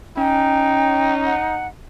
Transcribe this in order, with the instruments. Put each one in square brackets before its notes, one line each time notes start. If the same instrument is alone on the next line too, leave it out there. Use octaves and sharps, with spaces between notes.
[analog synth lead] C#4 [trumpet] D#4 [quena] G5
[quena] F#5